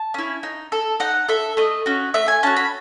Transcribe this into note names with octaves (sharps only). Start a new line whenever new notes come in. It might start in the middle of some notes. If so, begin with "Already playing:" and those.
Already playing: A5
C#4 E4
D#4
A4
D#4 F#5
A4 E5
A3 D#5
C#4 F#4
A3 E5
G#5
C#4 F#4 A5
B5